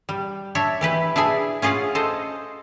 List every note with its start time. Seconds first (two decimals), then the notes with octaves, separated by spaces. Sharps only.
0.09 G3
0.55 D4 C#5 E5
0.81 E3 G4 B4
1.16 D4 E4 G#4 G#5
1.62 C#4 F4 G#4 F5 F#5
1.95 A4 C5 D#5